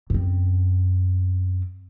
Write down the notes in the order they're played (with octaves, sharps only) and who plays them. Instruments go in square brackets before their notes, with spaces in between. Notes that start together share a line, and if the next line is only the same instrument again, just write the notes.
[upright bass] F#2 C4